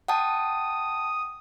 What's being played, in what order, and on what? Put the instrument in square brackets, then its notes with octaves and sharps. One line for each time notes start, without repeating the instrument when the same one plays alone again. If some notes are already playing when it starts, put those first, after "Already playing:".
[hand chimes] F#5 G5 A5 [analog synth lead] D#6